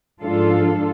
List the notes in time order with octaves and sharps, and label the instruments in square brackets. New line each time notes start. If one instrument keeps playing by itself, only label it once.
[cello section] G#2 F3 D4 F4 A4 F5